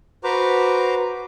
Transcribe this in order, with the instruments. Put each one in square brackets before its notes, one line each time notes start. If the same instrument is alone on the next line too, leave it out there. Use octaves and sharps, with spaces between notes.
[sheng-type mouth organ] F#4 B4 C5 A#5 D6